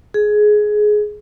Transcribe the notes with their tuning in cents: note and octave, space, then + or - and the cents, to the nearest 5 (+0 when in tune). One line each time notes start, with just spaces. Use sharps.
G#4 +15